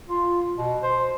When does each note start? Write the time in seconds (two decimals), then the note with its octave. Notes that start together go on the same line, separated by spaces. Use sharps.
0.09 F4
0.58 B2
0.83 C5